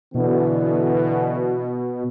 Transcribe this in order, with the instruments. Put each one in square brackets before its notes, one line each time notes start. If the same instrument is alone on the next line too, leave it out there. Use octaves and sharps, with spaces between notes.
[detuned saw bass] B2 [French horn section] D3 E3 B3